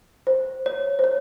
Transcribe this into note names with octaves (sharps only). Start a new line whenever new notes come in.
C5
C#5
C5
C#5